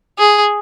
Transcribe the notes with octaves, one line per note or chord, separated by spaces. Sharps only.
G#4